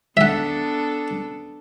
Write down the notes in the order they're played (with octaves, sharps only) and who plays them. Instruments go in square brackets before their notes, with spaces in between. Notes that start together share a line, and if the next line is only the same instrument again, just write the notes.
[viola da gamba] B3 D4 A4 [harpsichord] E5 F#5